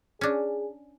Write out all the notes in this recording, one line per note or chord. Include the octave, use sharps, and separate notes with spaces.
C#4 D4 G#4